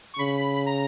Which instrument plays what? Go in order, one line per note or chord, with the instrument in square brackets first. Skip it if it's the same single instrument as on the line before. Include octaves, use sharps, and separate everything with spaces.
[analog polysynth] C#6
[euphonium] C#3 [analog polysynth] B5
[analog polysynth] A#5